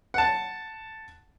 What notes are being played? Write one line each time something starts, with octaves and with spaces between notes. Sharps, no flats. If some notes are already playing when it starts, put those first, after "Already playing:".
F#5 A5